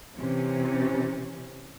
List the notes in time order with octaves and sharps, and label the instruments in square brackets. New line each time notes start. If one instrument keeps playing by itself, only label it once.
[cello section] C3 E3 C#4